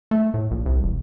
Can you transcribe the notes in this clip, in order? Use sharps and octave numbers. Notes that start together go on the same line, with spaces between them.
A3
A2
A#1
C2
E1